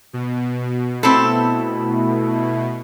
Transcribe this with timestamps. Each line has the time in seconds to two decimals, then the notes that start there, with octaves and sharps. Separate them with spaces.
0.13 B2
1.03 A3 C4 E4 A4 B5